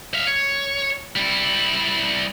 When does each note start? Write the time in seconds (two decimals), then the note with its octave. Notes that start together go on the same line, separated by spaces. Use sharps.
0.14 E5 F5
0.27 C#5
1.16 G3 E4